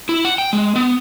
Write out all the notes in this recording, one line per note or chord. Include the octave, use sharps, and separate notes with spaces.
E4
F#5
G5
G#3
B3